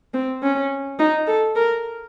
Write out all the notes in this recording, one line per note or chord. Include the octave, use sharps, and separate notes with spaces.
C4
C#4
D#4
A4
A#4